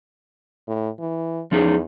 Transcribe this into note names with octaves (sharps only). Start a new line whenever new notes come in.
A2
E3
E2 F3 D#4 G#4